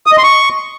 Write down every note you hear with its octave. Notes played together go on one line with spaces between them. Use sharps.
D#6
D#5
C6
C#6